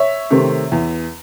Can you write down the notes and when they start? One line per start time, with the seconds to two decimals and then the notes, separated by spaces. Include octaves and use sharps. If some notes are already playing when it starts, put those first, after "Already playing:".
Already playing: C#5 E5
0.31 C3 D#3 A3 C4
0.72 E2